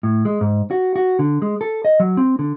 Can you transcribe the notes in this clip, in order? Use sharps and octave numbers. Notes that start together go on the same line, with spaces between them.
A2
G#3
G#2
F#4
F#4
D3
G#3
A4
D#5
F#3
C4
D3